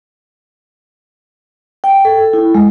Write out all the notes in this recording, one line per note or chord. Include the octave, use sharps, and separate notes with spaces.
G5
A4
E4
G#3